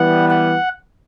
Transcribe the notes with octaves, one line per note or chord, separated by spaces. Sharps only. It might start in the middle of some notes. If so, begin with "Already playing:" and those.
Already playing: E3 G3 B3 F#5
F#5